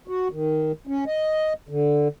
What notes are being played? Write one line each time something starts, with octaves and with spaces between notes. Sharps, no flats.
F#4
D#3
C#4
D#5
D3